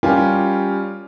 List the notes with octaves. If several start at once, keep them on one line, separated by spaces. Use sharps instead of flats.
G3 C#4 F4 G4 A#4